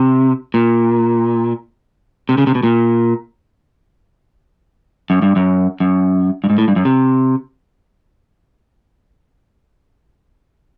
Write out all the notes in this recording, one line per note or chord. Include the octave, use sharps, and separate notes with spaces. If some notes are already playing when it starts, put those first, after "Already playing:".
Already playing: C3
A#2
C3
C#3
C3
B2
A#2
F#2
G2
F#2
F#2
G2
G#2
A2
G2
F#2
C3